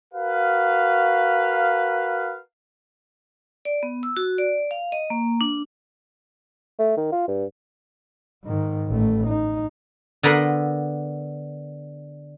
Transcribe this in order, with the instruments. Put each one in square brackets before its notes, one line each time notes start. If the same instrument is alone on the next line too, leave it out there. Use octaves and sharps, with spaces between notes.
[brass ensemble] F#4 A#4 B4 F5
[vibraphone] D5
B3
E6
F#4
D5
F5
D#5
A#3
D4
[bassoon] A3
D#3
F4
G2
[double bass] G#2 D#3
A1 A3
D#4
[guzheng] D3 B3 A#4 B5 C6